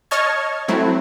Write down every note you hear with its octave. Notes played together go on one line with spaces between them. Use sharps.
C#5 D#5 A5 C#6 F6 G#6
F#3 A3 C4 E4